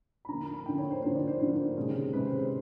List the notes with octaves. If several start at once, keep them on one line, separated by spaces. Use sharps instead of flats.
B5
D3 F3 A#3 A#5
B5
B5
D3 F3 A#3 G5
C#5
C5
D3 F3 A#3 C5
D5
C5
D3 F3 A#3 C5
C3 D#3 G#3 C#4
C3 D#3 G#3 C#4 B4
C5
C5